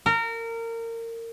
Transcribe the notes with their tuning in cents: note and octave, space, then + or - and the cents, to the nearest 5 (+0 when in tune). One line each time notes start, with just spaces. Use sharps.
A#4 -25